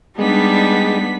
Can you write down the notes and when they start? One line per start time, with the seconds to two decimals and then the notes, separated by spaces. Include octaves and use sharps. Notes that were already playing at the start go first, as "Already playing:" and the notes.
0.19 G3 G#3 B3 D4 D#4 B6